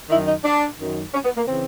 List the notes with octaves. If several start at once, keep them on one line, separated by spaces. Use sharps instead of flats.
F#2 D#3 E4
D#4
D4
F#2 D#3
C#4
B3
A#3
C#3 E3 C4